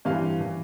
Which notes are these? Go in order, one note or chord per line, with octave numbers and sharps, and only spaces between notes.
G2 E3 G3 C4 F5
E3